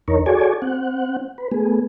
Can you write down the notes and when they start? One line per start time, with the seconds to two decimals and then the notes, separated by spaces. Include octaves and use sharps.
0.08 E2 D#4 A#4 C#5
0.26 F#4 G#4 A4 C#5 D5 G#5
0.62 C4 F#5
1.38 B4
1.52 A3 B3 G#4